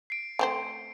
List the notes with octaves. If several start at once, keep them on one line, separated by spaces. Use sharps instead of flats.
C7 D7
A3 C4 C5